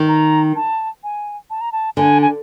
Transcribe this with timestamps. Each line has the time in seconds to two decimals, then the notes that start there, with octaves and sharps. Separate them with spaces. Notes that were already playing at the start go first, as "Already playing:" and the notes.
Already playing: D#3
0.08 A#5
0.56 A5
1.03 G#5
1.50 A5
1.61 A#5
1.72 A5
1.97 D3 G#5
2.22 G#5